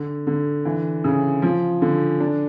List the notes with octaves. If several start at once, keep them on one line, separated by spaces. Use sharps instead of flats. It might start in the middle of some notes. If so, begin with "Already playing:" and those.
Already playing: D3
D3
E3
C#3
F3
D3
D4